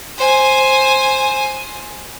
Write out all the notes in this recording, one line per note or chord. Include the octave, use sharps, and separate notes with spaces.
C5 G#5